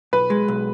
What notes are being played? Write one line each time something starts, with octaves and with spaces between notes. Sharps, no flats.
B1 B4
G#3
B1